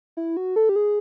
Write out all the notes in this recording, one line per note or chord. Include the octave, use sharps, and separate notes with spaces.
E4
F#4
A4
G4
G#4